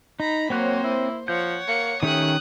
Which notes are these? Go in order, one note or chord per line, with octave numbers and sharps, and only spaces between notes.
D#4 A#5 B5
F#3 A#3 C4 C5 C#5 F#6
E4
F3 C#5 F#5 G6
A#3 C#7
D#3 A3 C#4 G4 D#6 F#6